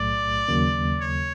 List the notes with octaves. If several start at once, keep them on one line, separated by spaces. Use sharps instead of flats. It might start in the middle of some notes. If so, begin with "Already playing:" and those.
Already playing: B1 A2 F#3 A3 D5
D#2 C#3 F#3 A#3
C#5